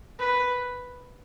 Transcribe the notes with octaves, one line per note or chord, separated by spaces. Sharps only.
B4